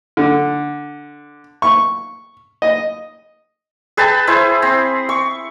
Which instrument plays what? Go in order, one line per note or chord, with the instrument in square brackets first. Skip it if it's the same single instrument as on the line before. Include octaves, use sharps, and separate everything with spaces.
[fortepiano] D3
C#6
D#5
[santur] G#4 B4 G5 A5
E4 G#4 C5
C4
C#6